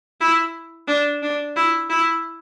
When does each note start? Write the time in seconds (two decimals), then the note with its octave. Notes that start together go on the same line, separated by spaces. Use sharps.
0.21 E4
0.88 D4
1.23 D4
1.56 E4
1.90 E4